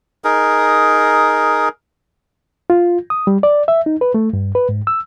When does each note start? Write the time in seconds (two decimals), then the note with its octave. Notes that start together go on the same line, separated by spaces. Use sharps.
0.24 D#4 G#4 A#4
2.70 F4
3.10 D#6
3.27 G3
3.43 D5
3.68 E5
3.86 D#4
4.01 B4
4.14 A3
4.33 G2
4.55 B4
4.69 G#2
4.87 E6